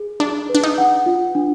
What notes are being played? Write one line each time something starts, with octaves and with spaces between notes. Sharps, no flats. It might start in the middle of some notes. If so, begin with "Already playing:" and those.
Already playing: G#4
D4 D5
B4
D4
D#4
F#5
F4
D4